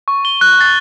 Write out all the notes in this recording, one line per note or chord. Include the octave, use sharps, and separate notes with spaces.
C#6
G7
F#6
A6